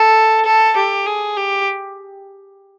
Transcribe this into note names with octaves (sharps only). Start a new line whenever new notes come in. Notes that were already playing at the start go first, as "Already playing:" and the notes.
Already playing: A4
A4
G4
G#4
G4